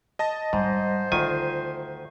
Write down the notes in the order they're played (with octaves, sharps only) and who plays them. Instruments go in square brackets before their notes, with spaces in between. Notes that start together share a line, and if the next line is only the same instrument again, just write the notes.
[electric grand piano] D#5 A5 A#6
[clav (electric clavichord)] G#2 [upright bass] G3 [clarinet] C5
[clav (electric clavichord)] D2 D#3 G#5 [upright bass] F4